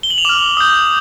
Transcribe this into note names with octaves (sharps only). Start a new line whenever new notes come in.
G7
F#7
F7
D6 F6 E7
D#6 G6